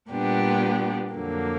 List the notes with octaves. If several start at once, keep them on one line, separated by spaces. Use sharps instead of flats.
A#2 G3 B3 D4 G4
F2 D3 F#3 A#3